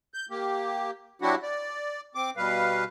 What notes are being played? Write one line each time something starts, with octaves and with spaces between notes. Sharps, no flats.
G6
A#3 G4
F#3 D4 E4 F#4 G4 F#5
D5
C4 D6
B2 G3 B4 F5